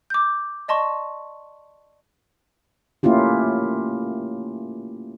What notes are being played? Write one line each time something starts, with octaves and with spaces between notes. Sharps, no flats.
D6 G6
D5 D#5 A5 C6 C#6
A3 A#3 C#4 E4 F4 G4